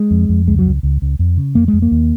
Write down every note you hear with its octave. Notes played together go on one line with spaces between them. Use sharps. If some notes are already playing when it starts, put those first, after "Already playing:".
Already playing: G#3
F2
F2
C#2 G#3
F#3
C#2
C#2
C#2
F2
C#3
F2 A#3
G#3
F2
A#3
D#2